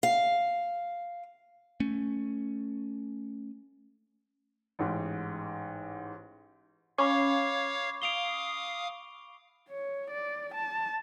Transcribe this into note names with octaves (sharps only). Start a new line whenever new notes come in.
F5
A3 C#4
A1 G#2
C#4 C#5 F5 B5 C#6 D6
F5 D#6 D7 F7 G7
C#5
D5
A5